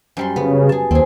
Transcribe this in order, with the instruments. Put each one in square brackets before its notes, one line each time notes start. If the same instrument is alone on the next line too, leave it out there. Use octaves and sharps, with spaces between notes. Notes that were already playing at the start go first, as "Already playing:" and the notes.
[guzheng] F#2 G3 C6
[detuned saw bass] C#3 [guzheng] B3
[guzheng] G#4 A5
[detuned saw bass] D#2 [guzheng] C4 G#4